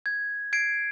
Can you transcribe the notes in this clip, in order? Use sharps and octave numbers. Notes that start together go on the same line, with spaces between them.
G#6
G#6 C7 D7